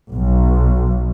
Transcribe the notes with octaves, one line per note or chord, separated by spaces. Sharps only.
B1